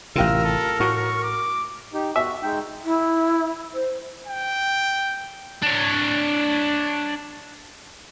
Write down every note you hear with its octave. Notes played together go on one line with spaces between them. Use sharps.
A1 C3 F4 G4 A#4 F5 E6
A4
A2 F#4 C#6
D6
D#4 G4
F#4 E5
G#3 D#4 G5
E4
C5
G5
D4 C#5